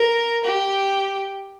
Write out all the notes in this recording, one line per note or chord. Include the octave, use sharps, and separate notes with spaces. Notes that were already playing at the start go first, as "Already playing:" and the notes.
Already playing: A#4
G4